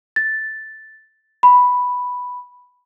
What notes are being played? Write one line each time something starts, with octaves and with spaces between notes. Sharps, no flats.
A6
B5